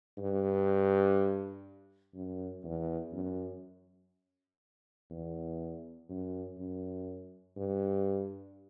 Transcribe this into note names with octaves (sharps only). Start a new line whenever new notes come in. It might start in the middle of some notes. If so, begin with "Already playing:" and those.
G2
F#2
E2
F#2
E2
F#2
F#2
G2